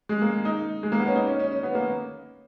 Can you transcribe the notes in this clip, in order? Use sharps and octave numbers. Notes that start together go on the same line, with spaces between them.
G#3
A#3
D#4
G#3
A#3
B3
C#4
D#4
C#4
C#4
C#4
B3
A#3